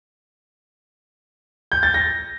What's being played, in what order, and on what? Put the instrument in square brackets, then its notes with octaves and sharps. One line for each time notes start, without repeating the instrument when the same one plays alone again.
[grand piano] G6
A6
A#6